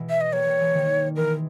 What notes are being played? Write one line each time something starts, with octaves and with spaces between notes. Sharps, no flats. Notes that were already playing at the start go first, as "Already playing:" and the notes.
Already playing: B2 E3 G#3
E5
D#5
G3 A#3 C#5
G3 A#3
E3 G#3
D#3 G3
E3 G#3 A#4